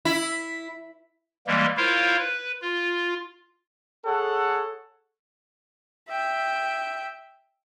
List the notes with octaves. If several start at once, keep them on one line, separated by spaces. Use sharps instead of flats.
E4
E3 G3 G#3 A#3
E4 F4 A#4 C5 C#5 F5
B4
F4
G#4 A4 C#5 F#5
E5 G5